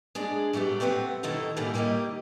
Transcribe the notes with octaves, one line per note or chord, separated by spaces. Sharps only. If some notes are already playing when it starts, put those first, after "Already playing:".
G#3 D4 G#4 D5
F#3 G3 A3 B3 G4
A3 B3 C4 B4 F#5
B2 D#3 E4 A4 A#5
E2 A2 G3 A#3 C#4 D#4
D#3 G3 A#3 E4 G4 D#5